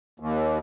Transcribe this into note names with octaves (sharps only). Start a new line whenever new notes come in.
D#2